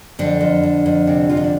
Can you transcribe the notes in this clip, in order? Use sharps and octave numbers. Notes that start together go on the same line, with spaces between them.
F2 D3 D4
F2
F2
F2
C3
F2 F4
D#4
D4